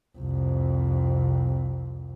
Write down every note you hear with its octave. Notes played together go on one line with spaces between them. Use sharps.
C2 F2